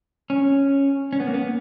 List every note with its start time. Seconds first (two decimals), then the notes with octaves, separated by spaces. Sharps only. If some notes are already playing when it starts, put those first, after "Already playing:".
0.30 C#4
1.13 C#4
1.20 B3
1.27 A#3
1.34 B3